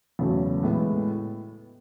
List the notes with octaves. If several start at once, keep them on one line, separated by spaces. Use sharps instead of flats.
E2 C#3 F#3 A3
A2 G#3 B3